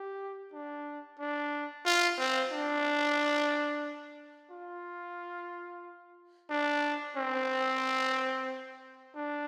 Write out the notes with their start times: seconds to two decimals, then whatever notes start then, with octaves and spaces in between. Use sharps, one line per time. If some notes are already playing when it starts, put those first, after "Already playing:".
Already playing: G4
0.53 D4
1.19 D4
1.85 F4
2.19 C4
2.52 D4
4.51 F4
6.50 D4
7.17 C4
9.16 D4